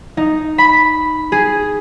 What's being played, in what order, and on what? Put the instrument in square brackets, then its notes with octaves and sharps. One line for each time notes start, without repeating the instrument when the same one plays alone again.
[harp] D#4
B5
G#4